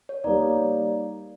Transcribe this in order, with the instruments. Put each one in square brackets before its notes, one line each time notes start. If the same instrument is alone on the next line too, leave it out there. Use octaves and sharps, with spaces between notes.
[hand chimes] C#5
[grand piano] G3 A#3 D#4 [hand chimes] D5